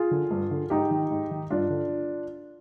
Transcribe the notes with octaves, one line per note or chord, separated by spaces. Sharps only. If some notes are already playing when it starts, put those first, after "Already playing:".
Already playing: F4 G#4
D3
G2
D3
G#2 D#4 G4
D#3
G#2
D#3
G2 D4 F4
D3